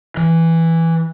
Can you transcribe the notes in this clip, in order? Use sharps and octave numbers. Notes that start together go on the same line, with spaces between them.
E3